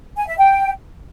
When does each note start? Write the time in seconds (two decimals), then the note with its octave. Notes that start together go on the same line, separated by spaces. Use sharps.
0.16 G#5
0.27 E5
0.38 G5